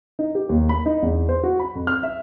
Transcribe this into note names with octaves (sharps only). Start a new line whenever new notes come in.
D#4
G4
D#2
B5
D#4
E2
C5
F#4
B5
F2
F6
E5